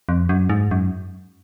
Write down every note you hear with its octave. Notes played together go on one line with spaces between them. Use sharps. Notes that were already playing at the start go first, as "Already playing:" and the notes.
F2
F#2
G#2
F#2